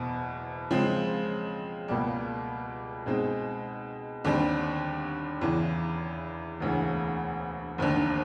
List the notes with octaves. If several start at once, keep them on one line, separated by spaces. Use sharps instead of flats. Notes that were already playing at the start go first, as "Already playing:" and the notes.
Already playing: F#1 E2 B2
C#3 F3 G#3 C4
C#2 B2 G3 A#3
B2 G#3 C4 D#4 G#4
D#2 D3 G3 C4
E2 C#3 E3
E1 D2 C#3 E3
F1 D#2 D3